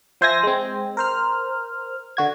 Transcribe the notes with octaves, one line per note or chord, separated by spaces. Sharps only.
F3 C5 E5 G#5 A#6
G#3 C4
A#4 C5 F6
D3 F#4 G#6